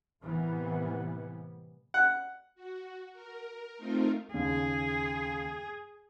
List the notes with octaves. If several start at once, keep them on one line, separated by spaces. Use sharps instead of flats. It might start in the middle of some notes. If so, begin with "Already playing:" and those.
A2 C3 E3 G3 A#3 B3
F#5
F#4
A#4
A3 C4 D#4 F4 A#4
D#2 C#3 G#4